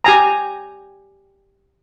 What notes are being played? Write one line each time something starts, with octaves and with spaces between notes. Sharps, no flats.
G4 G#5 A#5